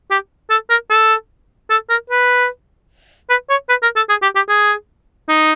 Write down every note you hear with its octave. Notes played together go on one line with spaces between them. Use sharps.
G4
A4
A#4
A4
A4
A#4
B4
B4
C#5
B4
A#4
A4
G#4
G4
G4
G#4
D#4